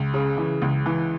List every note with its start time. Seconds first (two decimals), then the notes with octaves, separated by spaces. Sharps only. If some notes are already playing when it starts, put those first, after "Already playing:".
Already playing: C#2
0.14 C#3
0.37 E3
0.62 C#2
0.86 E3